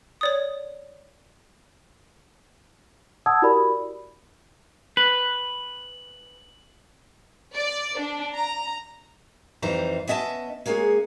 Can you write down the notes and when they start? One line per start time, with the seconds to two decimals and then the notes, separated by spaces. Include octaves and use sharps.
0.21 C#5 D5 D#6
3.26 F#5 A5 D#6 E6 G#6
3.42 E4 F#4 G4 A#4 D5 B5
4.97 B4 F#7
7.55 D5
7.99 D4
8.34 A#5
9.62 F2 E3 G3 D#4 C5 A#5
10.07 B3 C#4 D#5 E5 A5
10.66 G#3 A#3 C#4 G#4 C#5